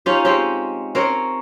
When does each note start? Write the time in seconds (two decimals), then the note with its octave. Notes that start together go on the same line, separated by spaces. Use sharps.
0.06 C#4 D#4 F4 G4
0.25 G#3 C4 C#4 G4
0.95 C4 C#4 A#4 C#5